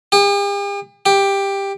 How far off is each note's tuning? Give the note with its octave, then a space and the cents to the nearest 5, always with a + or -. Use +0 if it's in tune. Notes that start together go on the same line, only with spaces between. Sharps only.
G4 +45
G4 +10